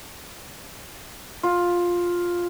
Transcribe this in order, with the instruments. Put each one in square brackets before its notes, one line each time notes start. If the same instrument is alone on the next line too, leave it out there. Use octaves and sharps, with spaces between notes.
[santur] F4